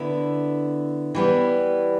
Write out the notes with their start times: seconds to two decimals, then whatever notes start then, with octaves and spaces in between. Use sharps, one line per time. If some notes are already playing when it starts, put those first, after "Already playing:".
Already playing: D3 B3 E4
1.15 E3 G3 B3